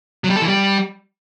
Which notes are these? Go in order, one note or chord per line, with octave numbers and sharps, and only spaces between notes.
F#3
G3
A4
E3
G3